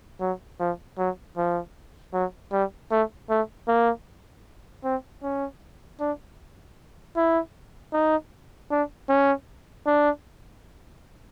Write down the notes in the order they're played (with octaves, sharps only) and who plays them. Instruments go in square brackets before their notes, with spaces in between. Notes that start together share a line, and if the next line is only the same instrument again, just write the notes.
[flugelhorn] F#3
F3
F#3
F3
F#3
G3
A3
A3
A#3
C4
C#4
D4
E4
D#4
D4
C#4
D4